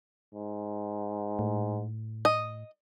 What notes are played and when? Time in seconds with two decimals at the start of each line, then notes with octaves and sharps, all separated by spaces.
0.34 G#2
1.39 A2
2.25 D#5